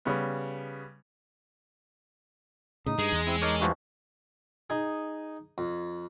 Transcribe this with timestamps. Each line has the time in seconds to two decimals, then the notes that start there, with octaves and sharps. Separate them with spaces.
0.05 C#3 G3 B3
2.86 A2 C#3 D#4 D#6
2.99 G2 G#3
3.12 E2
3.26 C4 E4
3.42 D#4 A4 A#4 C#5 D6
3.60 G2 E3 F3 F#4
4.70 D#4 G#4
5.58 F2